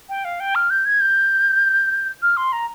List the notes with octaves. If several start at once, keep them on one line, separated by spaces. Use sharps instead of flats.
G5
F5
G5
F6
G6
G#6
G6
F6
C6
A#5